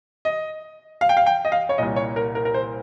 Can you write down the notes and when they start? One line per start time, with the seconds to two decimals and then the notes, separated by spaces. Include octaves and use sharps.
0.25 D#5
1.01 F5
1.09 G5
1.17 F5
1.26 G5
1.45 D#5
1.52 F5
1.69 C#5
1.78 C2 A#2 D#5
1.96 C#5
2.16 A#4
2.35 A#4
2.45 A#4
2.54 C5